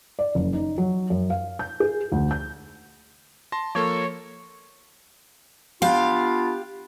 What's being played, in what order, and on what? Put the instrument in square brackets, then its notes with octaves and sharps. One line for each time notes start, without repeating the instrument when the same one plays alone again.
[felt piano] D5
F#1
D#4
F#3
F#2
F5
G6
G#4
D2
G6
[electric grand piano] A5 C6 A#6
[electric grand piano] F3 A#3 A4 [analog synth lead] C#5
[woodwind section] B3 D4 F4 [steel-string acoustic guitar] G4 F5